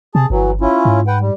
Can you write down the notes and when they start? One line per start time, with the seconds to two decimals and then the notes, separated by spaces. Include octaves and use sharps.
0.15 C3 G#4 A5
0.30 G1 E3 F#3
0.61 C#4 E4 F4
0.85 G#2
1.07 B4 F#5 G5
1.20 G3